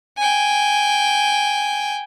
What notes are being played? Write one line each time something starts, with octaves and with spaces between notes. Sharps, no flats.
G5 G#5